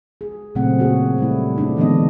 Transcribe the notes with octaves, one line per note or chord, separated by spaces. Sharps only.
G#4
A#2 C#3 F#3 A3 C4 F#5
A#3 F#4 G#4
G3 A3 E4
A3 D4 D#4
D3 E3 G#3 B3 D#4 D#5